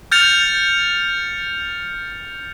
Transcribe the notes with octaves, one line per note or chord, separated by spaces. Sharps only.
F6 G6 A6 C#7 F7